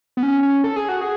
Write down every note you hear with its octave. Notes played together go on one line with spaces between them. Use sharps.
B3
C#4
C#4
A4
G#4
F#4
G#4